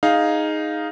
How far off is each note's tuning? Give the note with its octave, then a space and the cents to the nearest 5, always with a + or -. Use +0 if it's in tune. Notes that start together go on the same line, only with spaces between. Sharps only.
D#4 +0 G#4 +0 F5 +0